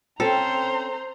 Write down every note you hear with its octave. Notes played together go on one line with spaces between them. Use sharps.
C4 C#4 A4 C5 A#5